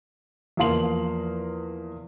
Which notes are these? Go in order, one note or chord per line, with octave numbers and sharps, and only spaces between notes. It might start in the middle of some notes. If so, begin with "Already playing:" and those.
E2 F3 A#3 F5 C6 F#7